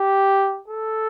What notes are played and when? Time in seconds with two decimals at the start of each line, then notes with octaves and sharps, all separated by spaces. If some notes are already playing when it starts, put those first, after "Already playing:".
Already playing: G4
0.68 A4